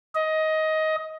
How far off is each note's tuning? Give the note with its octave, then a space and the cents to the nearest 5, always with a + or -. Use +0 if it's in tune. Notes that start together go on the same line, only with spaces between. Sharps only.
D#5 +15